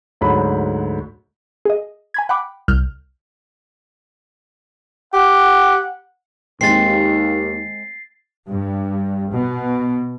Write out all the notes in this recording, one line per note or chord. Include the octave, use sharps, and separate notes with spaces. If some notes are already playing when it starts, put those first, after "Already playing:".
D2 G#2 F#3 B5
G#4 D#5
G#5 B5 G#6
F#5 G5 B5 D6
C2 F6 G6
G4 F#5
D#2 G#3 C4 A6 C7
G2
B2